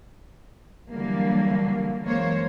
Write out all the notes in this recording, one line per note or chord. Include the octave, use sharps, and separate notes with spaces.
D3 E3 F#3 G3 A#3
F#2 E3 G#3 A#3 C5 C#5